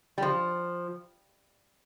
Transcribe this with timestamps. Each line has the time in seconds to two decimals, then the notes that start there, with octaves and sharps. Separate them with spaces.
0.18 G3
0.22 F3